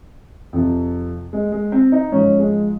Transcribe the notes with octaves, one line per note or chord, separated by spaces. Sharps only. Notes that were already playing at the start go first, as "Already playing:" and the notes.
F2 C3 F3
G#3
G#3
C4
D#4
G#2 F3 C#4
G#3